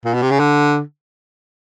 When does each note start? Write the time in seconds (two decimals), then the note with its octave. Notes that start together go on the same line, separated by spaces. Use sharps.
0.05 A#2
0.14 B2
0.22 C3
0.31 C#3
0.39 D3